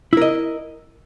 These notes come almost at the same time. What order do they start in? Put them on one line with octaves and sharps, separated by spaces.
E4 A#4 D#5